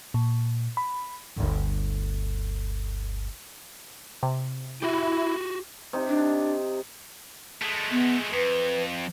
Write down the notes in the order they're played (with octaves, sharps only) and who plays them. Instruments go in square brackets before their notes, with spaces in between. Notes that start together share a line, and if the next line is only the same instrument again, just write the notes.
[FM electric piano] A#2
B5
[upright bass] G1 D2
[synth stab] C3
[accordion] E4 [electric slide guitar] F#4 G4
[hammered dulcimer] C3 D#4
[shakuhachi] D4
[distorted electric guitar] G#3 A3
[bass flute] B3
[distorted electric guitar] F2 [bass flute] B4